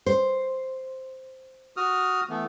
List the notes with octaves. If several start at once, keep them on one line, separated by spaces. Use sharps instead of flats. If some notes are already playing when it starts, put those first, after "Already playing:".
C5
F#4 D#6 F6
E3 A3 B3